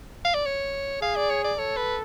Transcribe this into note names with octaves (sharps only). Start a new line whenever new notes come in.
F5
D5
C#5
G#4 F5
D5
C#5
D5
A4 C#5
B4